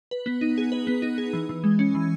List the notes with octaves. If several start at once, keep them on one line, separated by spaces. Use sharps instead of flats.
B4
B3
D#4
G#4
B4
B3
D#4
G#4
E3
E3
G#3
C#4
E3